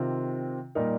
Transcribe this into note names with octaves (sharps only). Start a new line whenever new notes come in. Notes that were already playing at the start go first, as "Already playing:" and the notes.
Already playing: C3 D#3 C4 F4
A#2 G3 D#4 A#4